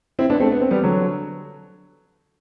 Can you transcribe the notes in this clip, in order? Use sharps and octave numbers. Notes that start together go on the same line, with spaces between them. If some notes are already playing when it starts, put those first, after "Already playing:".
C4 E4
B3 D4
A3 C4
B3
C4
G3 B3
D3 F#3